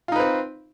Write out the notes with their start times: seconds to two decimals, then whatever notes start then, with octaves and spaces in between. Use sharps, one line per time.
0.08 F4
0.12 D#4
0.16 B4
0.20 C4